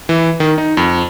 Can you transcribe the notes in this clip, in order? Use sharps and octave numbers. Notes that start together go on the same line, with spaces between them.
E3
D#3
D#4
F2